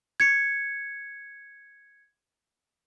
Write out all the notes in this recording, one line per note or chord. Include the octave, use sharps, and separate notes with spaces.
G#6 C#7